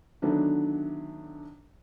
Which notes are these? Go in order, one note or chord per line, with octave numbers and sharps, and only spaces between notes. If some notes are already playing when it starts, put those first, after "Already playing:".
D3 D#3 F#3 A3 B3 D4